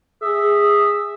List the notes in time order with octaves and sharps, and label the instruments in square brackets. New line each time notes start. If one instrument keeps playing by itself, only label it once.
[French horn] G#4 [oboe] E5 [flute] D#6